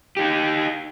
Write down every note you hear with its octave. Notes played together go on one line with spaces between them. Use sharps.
D#4 G4